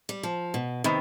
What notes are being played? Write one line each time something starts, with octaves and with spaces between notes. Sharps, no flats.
G3
F3
B2
C3 D#3 B3